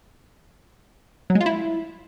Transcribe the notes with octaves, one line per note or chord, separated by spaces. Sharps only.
F#3
G#3
F4
E4